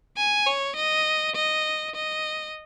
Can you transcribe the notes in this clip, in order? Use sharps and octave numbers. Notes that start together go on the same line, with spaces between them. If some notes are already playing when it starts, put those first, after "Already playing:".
G#5
C#5
D#5
D#5
D#5